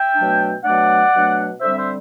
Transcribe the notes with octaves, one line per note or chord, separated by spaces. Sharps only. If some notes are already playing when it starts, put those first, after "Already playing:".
Already playing: E5 G5
B2 F#3 A3 D4
B2 F#3 A3 D4 D5 F#5
B2 F#3 A3 D4
D3 G3 C4 C5 E5
C5 E5